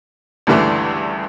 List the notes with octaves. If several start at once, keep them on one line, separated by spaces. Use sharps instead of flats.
C#2 G2 D3 E3 A3